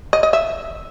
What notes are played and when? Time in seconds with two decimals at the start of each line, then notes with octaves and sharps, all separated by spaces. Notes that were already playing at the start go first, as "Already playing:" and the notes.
0.13 D#5
0.23 D#5
0.33 E5